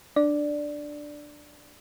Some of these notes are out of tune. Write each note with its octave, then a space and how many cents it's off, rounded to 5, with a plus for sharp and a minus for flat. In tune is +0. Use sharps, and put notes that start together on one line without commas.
D4 +10 D5 +0